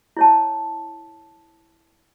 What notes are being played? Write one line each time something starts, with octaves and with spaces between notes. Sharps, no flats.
E4 C#5 A5